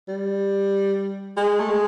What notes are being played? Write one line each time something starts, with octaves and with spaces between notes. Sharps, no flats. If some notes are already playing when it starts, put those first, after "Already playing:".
G3
G#3
A3
G#3